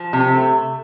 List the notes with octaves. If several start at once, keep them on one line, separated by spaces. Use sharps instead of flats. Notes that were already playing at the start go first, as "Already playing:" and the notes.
Already playing: F3
C3
C4
A3